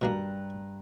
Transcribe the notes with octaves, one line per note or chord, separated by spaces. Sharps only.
G2 B2 D#3 A#3 A#5 F#6